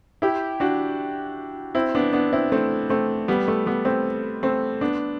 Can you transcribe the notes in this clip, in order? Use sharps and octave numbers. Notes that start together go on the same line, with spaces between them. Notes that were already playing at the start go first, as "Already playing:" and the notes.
E4 G4
D4 F#4
C4 E4
B3 D4
B3 D4
C4 E4
A3 C4
A3 C4
G3 B3
A3
G3 B3
A3 C4
A3 C4
B3 D4